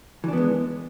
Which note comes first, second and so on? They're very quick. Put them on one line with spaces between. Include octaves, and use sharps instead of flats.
E3 D4 B3 G#3